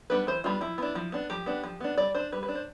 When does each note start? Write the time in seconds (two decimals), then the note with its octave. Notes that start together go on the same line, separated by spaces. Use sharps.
0.10 G3 B3 D4 B4
0.27 E3 C5
0.44 G3 B3 D4 F4
0.61 F3 E4
0.78 B3 D4
0.95 F3
1.12 B3 D4
1.30 F3 G4
1.46 B3 D4
1.64 F3
1.80 B3 D4
1.98 G3 D5
2.15 D4 C5
2.32 G3 B4
2.43 B4
2.48 D4
2.55 C5